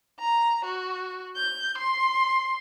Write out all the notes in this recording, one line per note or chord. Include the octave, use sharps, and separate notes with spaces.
A#5
F#4
G6
C6